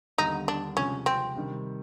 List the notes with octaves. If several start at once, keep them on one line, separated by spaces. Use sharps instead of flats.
D#2 D3 G3 B3 D#4
D4
C#2 C3 F3 C#4
C4
C3 D#3 G3